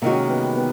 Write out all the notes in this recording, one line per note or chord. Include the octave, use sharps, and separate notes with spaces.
C3 D#3 G#3 A#3 C#4 F#4
B3
B3